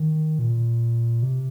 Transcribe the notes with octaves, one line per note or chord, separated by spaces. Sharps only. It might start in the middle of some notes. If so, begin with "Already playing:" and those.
Already playing: D#3
A#2
C3